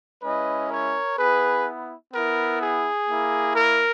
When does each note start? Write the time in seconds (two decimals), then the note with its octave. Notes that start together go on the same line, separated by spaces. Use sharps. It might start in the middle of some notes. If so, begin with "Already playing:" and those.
0.22 G#3 C#4 E4 B4 D#5
0.70 A#4 C#5
1.17 B3 E4 G#4 B4
2.12 B3 E4 A#4
2.60 G#4
3.08 A#3 E4
3.55 A#4